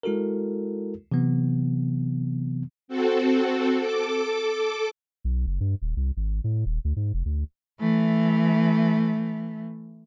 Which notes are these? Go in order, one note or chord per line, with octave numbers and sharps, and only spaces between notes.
G#3 E4 F#4 A4 A#4
C3 E3 F#3 B3
C4 F#4 A4
A4 D6
B1
F#1
G2
D#1
C2
G#1
A2
D#1
D2
G#2
F1
D2
E3 A3